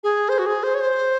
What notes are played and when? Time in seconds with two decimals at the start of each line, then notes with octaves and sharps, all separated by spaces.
0.04 G#4
0.29 C5
0.39 F#4
0.46 G#4
0.63 C5
0.75 C#5
0.80 C5